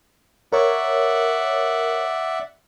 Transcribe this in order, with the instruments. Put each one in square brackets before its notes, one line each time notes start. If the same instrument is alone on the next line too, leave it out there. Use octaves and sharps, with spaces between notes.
[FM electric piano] A#4 C#5 [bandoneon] D5 E5 F#5